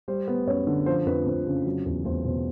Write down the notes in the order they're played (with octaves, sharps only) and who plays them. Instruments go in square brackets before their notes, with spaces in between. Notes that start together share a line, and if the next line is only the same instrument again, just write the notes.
[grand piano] G3 C5
B3
F#2 C#5
D3
F3 C5
F2 B4
F2
C#3
F#3
E2
E2 C5
B2 C5